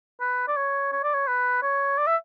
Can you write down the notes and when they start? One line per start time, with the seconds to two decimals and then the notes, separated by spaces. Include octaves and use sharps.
0.21 B4
0.48 D5
0.56 C#5
0.92 C#5
1.04 D5
1.14 C#5
1.27 B4
1.63 C#5
1.98 D5
2.07 E5